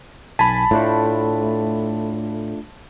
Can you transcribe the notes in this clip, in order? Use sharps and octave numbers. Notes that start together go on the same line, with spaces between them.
B1 G#5 A5 B5 B6
A2 A3 D4 F4